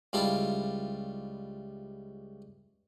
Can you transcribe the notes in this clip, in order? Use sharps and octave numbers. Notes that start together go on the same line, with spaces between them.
C#2 G3 E4 F4 A4